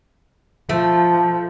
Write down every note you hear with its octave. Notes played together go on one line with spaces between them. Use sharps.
F3 A3